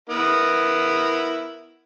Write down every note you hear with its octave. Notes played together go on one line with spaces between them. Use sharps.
B3 E4 A#4